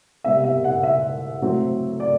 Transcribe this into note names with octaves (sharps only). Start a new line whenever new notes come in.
C3 G3 B3 E5
E5
F#5
E5
A2 F#3 C4
D5